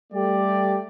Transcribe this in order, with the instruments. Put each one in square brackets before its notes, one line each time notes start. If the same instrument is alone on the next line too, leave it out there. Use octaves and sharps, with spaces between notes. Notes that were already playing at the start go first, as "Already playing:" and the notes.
[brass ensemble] G3 A3 G4 D5